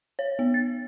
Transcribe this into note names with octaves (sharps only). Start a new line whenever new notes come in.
C#5
B3
A6